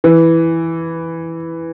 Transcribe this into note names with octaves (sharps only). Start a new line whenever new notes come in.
E3